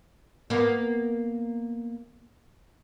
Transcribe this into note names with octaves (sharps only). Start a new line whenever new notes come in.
A#3 B3